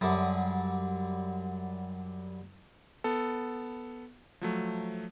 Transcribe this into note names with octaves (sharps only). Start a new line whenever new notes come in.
F#2 D3 G3 E5 D#6
B3 A4
F3 F#3 A3